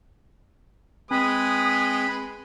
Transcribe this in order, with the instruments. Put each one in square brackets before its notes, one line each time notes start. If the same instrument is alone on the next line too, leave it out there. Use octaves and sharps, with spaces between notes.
[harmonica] G#3 [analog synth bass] C4 [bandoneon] B4 G#5 B5 [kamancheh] D#6